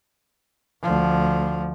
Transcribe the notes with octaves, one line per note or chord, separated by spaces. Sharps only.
D2 F3